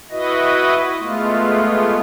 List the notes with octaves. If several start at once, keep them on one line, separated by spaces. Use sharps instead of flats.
E4 F#4 B4 D#5
G#3 A3 B3 F4